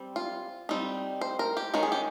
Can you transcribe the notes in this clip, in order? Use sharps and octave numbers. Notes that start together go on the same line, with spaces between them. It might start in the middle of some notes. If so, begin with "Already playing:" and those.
Already playing: G3 C4
F4
G3 C4 D#4
C5
A#4
G4
D#3 G#3 C#4 A#4
G#4
G4